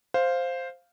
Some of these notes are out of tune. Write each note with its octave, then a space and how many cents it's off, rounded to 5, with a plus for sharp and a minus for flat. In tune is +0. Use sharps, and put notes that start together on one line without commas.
C5 +0 F5 +0